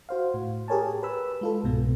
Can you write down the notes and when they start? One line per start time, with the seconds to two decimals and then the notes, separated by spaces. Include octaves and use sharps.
0.09 F#4 C5 F5
0.34 A2
0.68 G4 G#4 A#4 C#5 G#5 A5
1.03 B4 B5 E6
1.41 G#3 F4 A4
1.63 C2 G#2 B2 B3